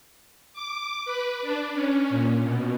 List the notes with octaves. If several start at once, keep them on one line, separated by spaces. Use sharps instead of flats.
D6
B4
D4
C#4
A#2
B2